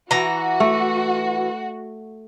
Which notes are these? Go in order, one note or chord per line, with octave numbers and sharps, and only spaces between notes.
E3 F#4 A#5
A3